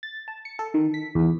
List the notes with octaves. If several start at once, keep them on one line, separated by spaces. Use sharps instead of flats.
A6
A5
C#7
A4
D#3
B6
E2